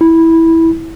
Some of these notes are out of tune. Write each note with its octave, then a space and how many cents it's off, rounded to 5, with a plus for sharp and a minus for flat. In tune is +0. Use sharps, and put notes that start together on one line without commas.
E4 -10